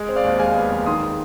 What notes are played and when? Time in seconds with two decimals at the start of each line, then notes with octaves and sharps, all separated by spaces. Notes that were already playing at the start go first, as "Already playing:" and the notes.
Already playing: G#3
0.09 C4
0.16 D5 F5
0.24 D#2
0.39 G#3 F5 G#5
0.56 B3
0.71 F2
0.86 D#3 C6 D#6
1.02 G#3